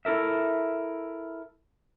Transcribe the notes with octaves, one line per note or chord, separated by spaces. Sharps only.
E4 A4 A#4 E5